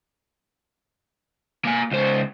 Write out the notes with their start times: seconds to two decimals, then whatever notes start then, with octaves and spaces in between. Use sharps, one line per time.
1.65 A#3 G#5
1.91 C#2 C5